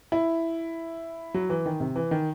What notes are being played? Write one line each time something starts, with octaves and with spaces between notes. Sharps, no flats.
E4
F#3
E3
D#3
C3
E3
D#3